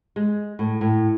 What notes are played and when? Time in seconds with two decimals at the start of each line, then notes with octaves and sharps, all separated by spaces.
0.16 G#3
0.59 A2
0.81 A2